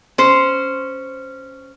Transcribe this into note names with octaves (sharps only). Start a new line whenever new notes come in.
C#4 C5